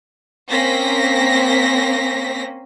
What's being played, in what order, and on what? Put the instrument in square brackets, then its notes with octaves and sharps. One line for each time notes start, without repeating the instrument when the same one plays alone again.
[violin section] A#3 C4 C#4 A#6 B6